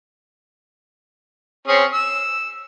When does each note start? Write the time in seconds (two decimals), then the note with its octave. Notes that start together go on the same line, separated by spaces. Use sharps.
1.68 C4 C#4 G#4
1.93 E6